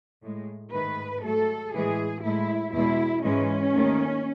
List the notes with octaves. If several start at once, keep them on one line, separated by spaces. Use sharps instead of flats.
A2 G#3
G#2 D#3 A3 B4
G#2 F#3 A3 A4
A2 E3 G#3 G#4
A2 G#3 E4
E2 B2 G#3 E4
G#2 E3 G#3 C#4
D#2 D#3 A3